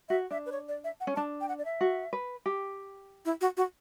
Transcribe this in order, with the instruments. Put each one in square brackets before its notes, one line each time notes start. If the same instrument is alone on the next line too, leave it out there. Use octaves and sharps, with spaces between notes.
[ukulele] F#4 [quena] E5
[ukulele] D4 [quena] E5
[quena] B4
C#5
D5
E5
F#5
[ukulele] C#4
[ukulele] D4 [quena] A5
[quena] G5
F#5
D5
E5
[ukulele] F#4
B4
G4
[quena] E4
F#4
F#4